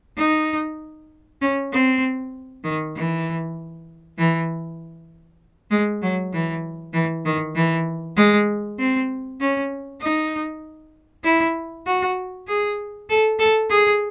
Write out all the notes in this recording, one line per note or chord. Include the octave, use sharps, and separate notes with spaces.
D#4
C#4
C4
D#3
E3
E3
G#3
F#3
E3
E3
D#3
E3
G#3
C4
C#4
D#4
E4
F#4
G#4
A4
A4
G#4